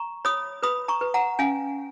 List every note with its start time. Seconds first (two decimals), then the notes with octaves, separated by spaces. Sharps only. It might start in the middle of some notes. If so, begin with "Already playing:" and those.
Already playing: A#5 C#6
0.25 C#5 B5 D#6
0.63 B4 B5 D#6
0.88 A#5 C#6
1.01 B4
1.14 F#5 A#5
1.39 C#4 F5 G#5